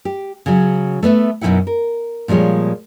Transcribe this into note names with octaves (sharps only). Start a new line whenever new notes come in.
G4
C#3 F#3
A3 B3 B4 E5
F#2 B2 E3 D#4 E4 F#5
A#4
A#2 F3 G3 G#3 C#5